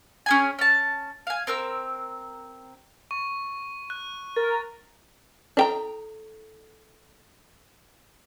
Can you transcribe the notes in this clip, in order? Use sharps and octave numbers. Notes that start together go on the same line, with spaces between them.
C#4 G#4 G#5
C#4 A5
F5 G#5
C4 A#4 E6
C#6
F#6
A#4 A6
D4 E4 A4 G5 A#5